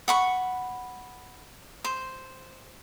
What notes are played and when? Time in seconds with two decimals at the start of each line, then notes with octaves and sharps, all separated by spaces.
0.08 F#5 B5 C#6
1.84 C5